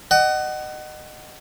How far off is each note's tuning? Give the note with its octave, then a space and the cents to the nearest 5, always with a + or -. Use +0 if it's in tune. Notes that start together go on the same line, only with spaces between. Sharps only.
D#5 -25 F#5 +25